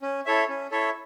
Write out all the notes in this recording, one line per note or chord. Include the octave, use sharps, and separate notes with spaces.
C#4
E4 A4 C#5 E5
C#4
E4 A4 C#5 E5